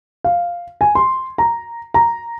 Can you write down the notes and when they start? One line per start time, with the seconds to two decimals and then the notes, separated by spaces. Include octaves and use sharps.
0.24 F5
0.81 G#5
0.95 C6
1.38 A#5
1.94 A#5